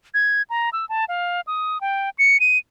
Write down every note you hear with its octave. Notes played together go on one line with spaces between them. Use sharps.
G#6
A#5
E6
A5
F5
D#6
G5
C#7
D#7